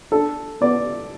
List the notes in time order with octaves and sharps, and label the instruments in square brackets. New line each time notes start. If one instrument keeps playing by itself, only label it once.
[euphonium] D4 [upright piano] A4
[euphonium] B3 [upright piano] D5